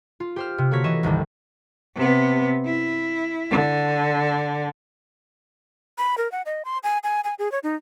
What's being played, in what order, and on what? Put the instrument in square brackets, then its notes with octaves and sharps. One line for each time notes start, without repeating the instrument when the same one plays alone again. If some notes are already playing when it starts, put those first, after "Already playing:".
[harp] F4
G4 C5 F6
C3
D3 A#3 F#4 C#5 B6
E3 D#5 C#6 E7
G1 C2 D3 D#3 G3
[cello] C3 B3
E4
D3
[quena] B5
A#4
F#5
D#5
C6
G#5
G#5
G#5
G#4
C#5
D#4